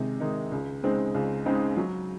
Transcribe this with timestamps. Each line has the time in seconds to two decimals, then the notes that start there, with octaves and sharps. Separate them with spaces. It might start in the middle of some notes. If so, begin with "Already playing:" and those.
Already playing: C3 D#3 G#3 D#4
0.20 D#3 G#3 D#4
0.52 C#2
0.83 C#3 G#3 C4 D#4
1.14 C#2
1.46 C#3 G#3 C4 D#4
1.77 F#3